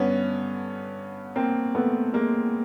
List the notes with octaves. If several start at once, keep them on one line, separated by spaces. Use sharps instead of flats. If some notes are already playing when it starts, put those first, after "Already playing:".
Already playing: G2 D3 B3 C#4
A#3 C4
A3 B3
G#3 A#3